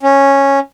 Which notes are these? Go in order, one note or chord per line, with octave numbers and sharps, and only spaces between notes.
C#4